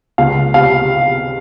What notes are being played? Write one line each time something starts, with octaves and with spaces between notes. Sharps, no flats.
C#2 F5
C3 F5